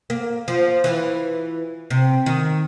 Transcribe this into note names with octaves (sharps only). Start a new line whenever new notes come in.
A#3
F3
E3
C3
D#3